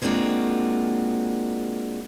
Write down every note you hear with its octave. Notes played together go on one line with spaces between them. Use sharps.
G#3 A#3 C4 D4 F4 F#4